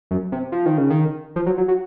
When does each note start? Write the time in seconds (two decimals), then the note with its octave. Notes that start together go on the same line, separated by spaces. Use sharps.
0.11 F#2
0.32 C3
0.52 F3
0.66 D#3
0.78 C#3
0.91 D#3
1.36 F3
1.46 F#3
1.58 F#3
1.68 F#3